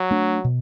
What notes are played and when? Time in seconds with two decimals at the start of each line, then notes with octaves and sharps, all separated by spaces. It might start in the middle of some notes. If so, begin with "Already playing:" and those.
Already playing: F#3
0.11 A3 D4
0.44 B2